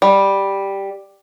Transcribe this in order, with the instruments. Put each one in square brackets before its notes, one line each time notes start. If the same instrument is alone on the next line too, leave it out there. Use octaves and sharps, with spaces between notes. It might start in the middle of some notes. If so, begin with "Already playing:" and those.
[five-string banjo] G3